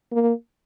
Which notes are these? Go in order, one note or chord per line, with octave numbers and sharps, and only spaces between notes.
A#3